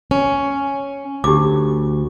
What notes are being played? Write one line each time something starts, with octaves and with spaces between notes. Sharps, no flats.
C#4
D2 G4 D6